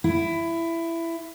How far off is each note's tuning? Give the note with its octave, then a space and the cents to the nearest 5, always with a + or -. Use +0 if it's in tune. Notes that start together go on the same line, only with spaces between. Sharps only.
E4 +15